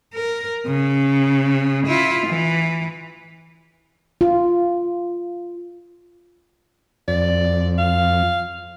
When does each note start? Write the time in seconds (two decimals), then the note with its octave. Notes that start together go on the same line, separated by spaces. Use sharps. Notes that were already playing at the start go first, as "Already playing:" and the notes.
0.14 A#4
0.66 C#3
1.87 E4 F4
2.27 E3
4.21 F4
7.08 F2 D5
7.78 F5